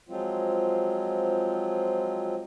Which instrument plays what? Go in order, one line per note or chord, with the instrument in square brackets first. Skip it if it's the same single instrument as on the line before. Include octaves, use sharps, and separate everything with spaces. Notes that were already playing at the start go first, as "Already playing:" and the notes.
[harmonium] F3 F#3 G#3 C4 F4